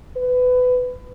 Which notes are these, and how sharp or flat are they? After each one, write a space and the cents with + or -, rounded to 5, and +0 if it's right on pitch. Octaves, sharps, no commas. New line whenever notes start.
B4 +20